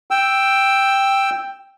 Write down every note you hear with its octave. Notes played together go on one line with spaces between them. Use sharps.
G5 E6